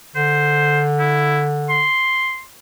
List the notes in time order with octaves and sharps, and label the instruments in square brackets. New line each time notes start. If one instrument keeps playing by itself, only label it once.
[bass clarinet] D3 [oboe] C5
[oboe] E4
C6